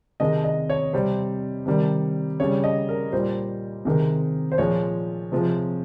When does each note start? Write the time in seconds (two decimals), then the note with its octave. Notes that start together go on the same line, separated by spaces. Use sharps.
0.20 C3 D#3 G#3 D#5
0.44 D#5
0.70 C#5
0.93 C3 G3 C5
1.66 C3 D#3 G3
2.40 C#3 G3 C#5
2.64 D#5
2.89 A#4
3.13 A#2 G3 C5
3.85 C3 D#3 G#3
4.52 C5
4.58 A#2 F3 G#3 C#5
5.32 C3 F3 G#3